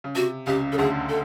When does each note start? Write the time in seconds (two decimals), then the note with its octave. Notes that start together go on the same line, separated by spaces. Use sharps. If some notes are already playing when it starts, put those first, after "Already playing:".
0.04 C#3
0.15 C3 F#4
0.47 C#2 C#3 G4
0.72 C#3 A4
0.78 D2 D3 G#4
1.09 A4